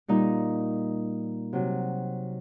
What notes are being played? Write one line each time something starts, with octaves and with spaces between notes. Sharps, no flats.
A#2 G3 D#4
C3 F#3